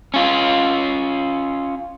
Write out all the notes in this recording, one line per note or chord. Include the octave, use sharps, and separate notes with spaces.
C#4 F4